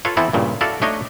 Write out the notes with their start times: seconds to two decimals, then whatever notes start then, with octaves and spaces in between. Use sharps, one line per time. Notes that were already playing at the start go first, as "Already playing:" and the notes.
0.05 F4 A4 B4 C#5 F5
0.17 E3 B3 C4 E4 A4 B4
0.33 G2 A#2 C#3
0.61 E4 F#4 A4 D5 F5 F#5
0.82 A3 D4 D#4 C#5 D#5